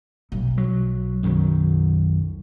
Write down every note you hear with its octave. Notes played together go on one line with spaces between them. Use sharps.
B1
F#3
F#2 D#3 F#3